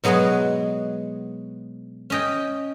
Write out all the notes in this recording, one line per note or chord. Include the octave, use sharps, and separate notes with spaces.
B2 F#3 G#3 B3 F#4
C#4 D#5 G5